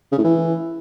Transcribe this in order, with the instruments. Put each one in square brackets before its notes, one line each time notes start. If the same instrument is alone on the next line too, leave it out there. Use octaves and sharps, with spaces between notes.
[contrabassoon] C#3
A2
E3